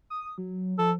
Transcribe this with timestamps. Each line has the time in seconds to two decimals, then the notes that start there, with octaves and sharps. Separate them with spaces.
0.10 D#6
0.38 F#3
0.79 F3 A4